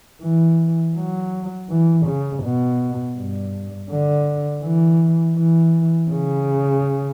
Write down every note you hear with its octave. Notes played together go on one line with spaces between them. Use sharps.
E3
F#3
E3
C#3
B2
G2
D3
E3
E3
C#3